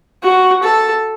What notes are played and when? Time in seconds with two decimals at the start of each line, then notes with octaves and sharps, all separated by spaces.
0.24 F#4
0.63 A4